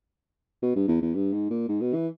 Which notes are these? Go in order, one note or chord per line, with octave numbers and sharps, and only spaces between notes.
B2
G2
E2
E2
G2
G#2
A#2
G#2
B2
E3